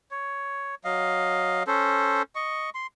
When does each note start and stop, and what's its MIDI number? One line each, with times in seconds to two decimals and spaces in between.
0.11 0.75 73
0.84 1.63 54
0.84 1.63 75
0.84 1.63 77
1.67 2.22 61
1.67 2.22 69
1.67 2.22 72
2.35 2.70 75
2.35 2.70 85
2.75 2.87 84